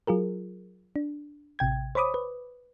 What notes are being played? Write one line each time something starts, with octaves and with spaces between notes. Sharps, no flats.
F#3 F4 G#4 A#4
D4
A1 C3 G5 G#6
C5 C#5 B5 D6 D#6
B4